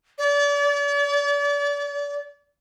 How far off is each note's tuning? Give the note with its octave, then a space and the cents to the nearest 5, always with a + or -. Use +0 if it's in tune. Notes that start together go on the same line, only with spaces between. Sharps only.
D5 -40